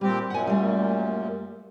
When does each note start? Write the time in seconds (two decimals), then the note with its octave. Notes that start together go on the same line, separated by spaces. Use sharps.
0.01 A#2 G3 C4 G4
0.30 F#2 A#2 F#5 G#5
0.47 G3 A3